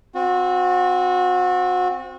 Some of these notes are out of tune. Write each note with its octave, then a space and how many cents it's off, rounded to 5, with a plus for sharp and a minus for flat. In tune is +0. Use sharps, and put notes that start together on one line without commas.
C4 +0 F#4 -30